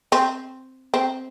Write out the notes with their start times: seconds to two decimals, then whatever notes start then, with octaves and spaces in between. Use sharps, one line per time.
0.12 C4
0.94 C4